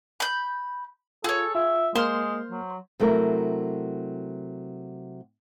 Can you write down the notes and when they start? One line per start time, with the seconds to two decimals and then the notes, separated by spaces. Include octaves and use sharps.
0.20 B5 G6
1.24 F4 G#4 A4 C#5
1.55 F4 E5
1.95 G#3 A#3 C5 C6 F6
2.51 F#3
3.00 C3 F#3 A3 E4 A#4